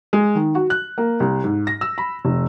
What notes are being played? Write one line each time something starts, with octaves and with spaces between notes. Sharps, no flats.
G#3
D#3
F#4
F#6
A#3
C2
G#2
A#6
E6
B5
F1